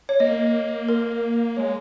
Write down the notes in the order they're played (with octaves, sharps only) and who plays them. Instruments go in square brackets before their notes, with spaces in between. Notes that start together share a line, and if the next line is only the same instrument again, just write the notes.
[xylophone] C#5
[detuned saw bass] A#3 [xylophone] D#5
[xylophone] A#4
[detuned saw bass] G#3 [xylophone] C#5